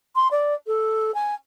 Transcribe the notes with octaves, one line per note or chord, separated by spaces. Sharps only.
C6
D5
A4
G#5